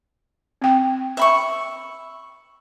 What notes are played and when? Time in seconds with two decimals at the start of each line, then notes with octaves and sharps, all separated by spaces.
0.62 C4 G5
1.17 E5 B5 C#6